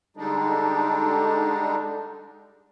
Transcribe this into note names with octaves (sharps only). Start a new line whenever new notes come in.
D3 G3 G#3 D4 D#4